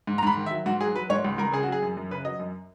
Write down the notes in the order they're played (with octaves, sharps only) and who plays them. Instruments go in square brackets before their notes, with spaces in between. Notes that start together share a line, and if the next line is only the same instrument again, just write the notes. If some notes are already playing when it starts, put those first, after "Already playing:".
[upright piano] G#2
A#5
G#2 B5
D#3
E5
F#3
G#2 F#4
F#3 G#4
F#3 B4
G#2 C#5
C#2
C#2 A#4
C#3 G#4
F#4
F#3
G#4
F#2
F#2
C#3 B4
F#3 D#5
F#2